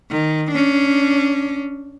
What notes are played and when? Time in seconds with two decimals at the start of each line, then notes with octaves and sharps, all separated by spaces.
0.11 D#3
0.51 C#4 D4